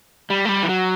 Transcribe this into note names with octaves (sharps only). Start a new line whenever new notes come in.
G3
A3
G3
E3
F#3